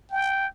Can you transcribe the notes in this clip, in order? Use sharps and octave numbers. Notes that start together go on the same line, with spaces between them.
G5